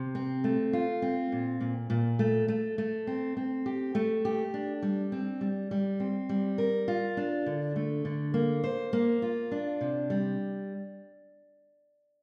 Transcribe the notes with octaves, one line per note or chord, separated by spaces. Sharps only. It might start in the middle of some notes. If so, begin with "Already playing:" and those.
Already playing: C3
C4
A3
F4
C4
A#2
A#2
A#2
A3
A3
A3
C4
C4
G4
A3
G4
D4
G3
C4
G3
G3
C4
G3
A#4
F4
D4
D3
A3
D3
A#3
C5
A#3
F4
D4
C3
G3